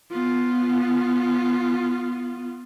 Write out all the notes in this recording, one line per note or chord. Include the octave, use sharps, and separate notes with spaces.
B3 F4